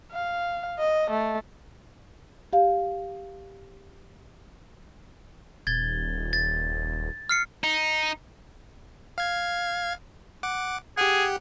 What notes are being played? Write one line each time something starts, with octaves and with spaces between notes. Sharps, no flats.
F5
D#5
A3
G4 F5
D#1 G#6 A6 G7
A6
F6 C7 C#7
D#4
F5 G#6
F#5 D6
G4 G#4 F#5